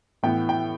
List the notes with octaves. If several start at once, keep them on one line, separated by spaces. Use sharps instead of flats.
A2 E3 B3 G5
G5